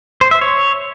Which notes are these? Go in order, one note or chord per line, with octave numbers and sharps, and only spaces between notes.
C5
E5
C#5